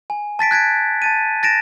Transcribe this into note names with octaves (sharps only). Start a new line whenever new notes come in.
G#5
A5 A6 B6 D7
F#6 G#6 B6 D7
A5 A6 D#7
A6 A#6 D7 E7